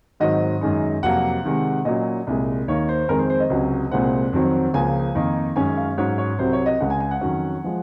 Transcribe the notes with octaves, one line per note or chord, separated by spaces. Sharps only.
G#2 D#3 F#3 C4 D#5
F#2 D#3 G#3 D#4
F2 C3 F#3 A#3 F#5
C3 D#3 G#3
A#2 F#3 C#4 D#5
C2 A#2 G#3
D#2 D#3 A#3 D#4 C#5
C5
F2 D#3 G#3 C4 A#4
C5
C5
D#5
C#2 C3 F#3 C#4
C2 A#2 G#3 C4 F#5
F2 D#3 F#3 C4
C#2 C#3 F3 A#3 G#5
F2 D#3 A#3 D#4
F#2 D#3 G#3 C#4 G#5
F5
G#2 F#3 C#4 C#5
C#5
C2 C3 F#3 C5
C#5
D#5
C#2 C#3 G#3 F#5
G#5
G#5
F#5
F2 D#3 F#3 C#4
F3 G#3